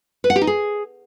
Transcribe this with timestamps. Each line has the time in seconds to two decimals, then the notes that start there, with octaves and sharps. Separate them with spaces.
0.24 B4
0.30 F#5
0.36 G4
0.41 D#4
0.47 G#4